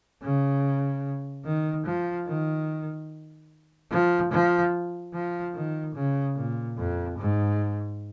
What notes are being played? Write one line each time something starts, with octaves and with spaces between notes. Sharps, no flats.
C#3
D#3
F3
D#3
F3
F3
F3
D#3
C#3
A#2
F2
G#2